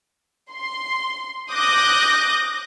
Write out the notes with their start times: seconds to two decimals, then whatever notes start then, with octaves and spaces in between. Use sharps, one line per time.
0.52 C6
1.51 D6 D#6 F#6 G6 A#6